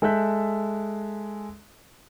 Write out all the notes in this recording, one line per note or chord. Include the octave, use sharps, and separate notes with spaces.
G#3 A4 E5 F#6 G6 B6